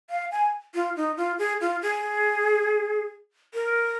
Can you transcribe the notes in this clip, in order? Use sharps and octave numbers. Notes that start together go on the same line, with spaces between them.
F5
G#5
F4
D#4
F4
G#4
F4
G#4
A#4